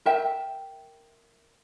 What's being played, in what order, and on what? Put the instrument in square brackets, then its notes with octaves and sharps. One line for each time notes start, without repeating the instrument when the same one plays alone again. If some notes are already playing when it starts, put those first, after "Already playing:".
[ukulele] A#4 E5 G5